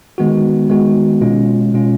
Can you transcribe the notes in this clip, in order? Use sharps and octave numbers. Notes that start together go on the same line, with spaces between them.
D#3 G#3 B3 F#4
D#3 G#3 B3 F#4
B2 G#3 C#4 F4
B2 G#3 C#4 F4